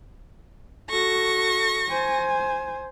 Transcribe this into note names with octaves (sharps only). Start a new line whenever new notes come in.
F#4 A4 C#6 A#6
C5 G#5